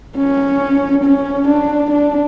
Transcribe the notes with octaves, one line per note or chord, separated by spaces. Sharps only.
C#4
C#4
D4
D4